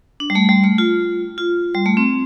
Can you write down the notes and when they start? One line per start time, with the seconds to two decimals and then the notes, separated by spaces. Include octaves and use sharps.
0.20 D4
0.30 G3
0.35 A3
0.49 G3
0.64 A3
0.78 F4
1.38 F4
1.74 G3
1.86 A3
1.97 C4